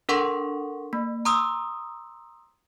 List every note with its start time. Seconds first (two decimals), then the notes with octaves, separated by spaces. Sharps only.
0.09 D4 A4 A#4 F#5 C6 C#6
0.93 A#3
1.25 A#5 C6 D#6 E6